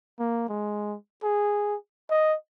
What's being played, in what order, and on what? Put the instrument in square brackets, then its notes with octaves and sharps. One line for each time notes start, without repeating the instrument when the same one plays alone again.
[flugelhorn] A#3
G#3
G#4
D#5